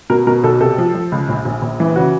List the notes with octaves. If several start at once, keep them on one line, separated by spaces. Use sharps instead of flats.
B2 A#4
B2 A#4
B1 A4
C3 A4
F3
F3
C#2
A#1
A#1
A#1
E3
C#3 F#4